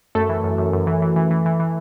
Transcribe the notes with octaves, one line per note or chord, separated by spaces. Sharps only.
F#2 A3 A4
E3
F#2
F#2
F#2
E3
E3
E3
E3
E3
E3